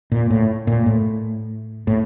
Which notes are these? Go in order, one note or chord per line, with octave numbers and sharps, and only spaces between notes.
A#2
A2
A#2
A2
A2